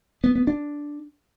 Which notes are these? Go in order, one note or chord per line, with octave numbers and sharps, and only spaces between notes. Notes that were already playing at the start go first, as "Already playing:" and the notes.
B3
B3
D4